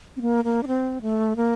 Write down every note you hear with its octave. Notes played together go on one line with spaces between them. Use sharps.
C4
A#3
A#3
D4
C4
A3
A#3